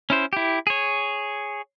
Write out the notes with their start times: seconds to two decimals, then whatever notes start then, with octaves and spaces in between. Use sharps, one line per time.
0.10 C#4 E4 C5
0.33 E4 G4
0.67 G#4 C#5